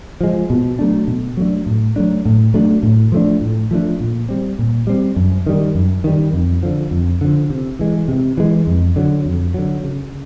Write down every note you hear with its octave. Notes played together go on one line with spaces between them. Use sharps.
F3 G#3
B2
F#3 A3 D4
B2
F#3 A3 D4
A2
F#3 A3 D4
A2
F#3 A3 D4
A2
F3 A3 D4
A2
F3 A3 D4
A#2
G3 C4
A#2
G3 C4
F#2
D#3 G3
F#2
D#3 G3
F2
D3 F3
F2
D3 F3
C3
E3 G#3
C3
E3 G#3
F2
D3 F#3
F2
D3 F#3
C#3